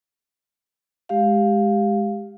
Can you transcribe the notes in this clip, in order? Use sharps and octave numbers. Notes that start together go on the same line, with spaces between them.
G#3 G4 F5